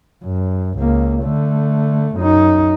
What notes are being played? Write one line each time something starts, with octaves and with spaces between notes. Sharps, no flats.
F#2
C#2 A#3
D3 A3
F#2 D#4